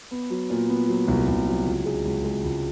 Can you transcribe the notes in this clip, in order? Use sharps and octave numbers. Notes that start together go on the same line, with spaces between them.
B3
F#3
A#2
B3
F#3
C2
C2
F#3
C#2
G#3
C#2
G#3
C#2